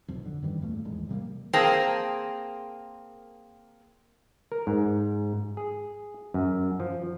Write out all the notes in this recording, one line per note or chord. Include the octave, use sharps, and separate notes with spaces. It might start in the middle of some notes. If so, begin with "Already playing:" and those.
F1 B1 F2
D3
F#2 D#3 E3 G3
E2 G2 A#2 A3
D#1 G#1 E2 G#3
C3 G3 A3 A#3
A#3 C4 G#4 A#4 G5 A5
A#4
G#2
G#4
F#2
F3